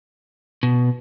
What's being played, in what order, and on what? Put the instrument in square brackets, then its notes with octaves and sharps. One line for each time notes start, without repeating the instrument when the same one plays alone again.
[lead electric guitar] B2